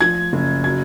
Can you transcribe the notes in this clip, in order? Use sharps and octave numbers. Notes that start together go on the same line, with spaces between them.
F3 G#6
F#1
F#3 G#6